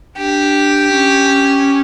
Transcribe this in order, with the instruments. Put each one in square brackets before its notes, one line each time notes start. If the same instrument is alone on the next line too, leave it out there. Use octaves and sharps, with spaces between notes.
[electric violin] D4 [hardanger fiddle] G4
[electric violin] C#4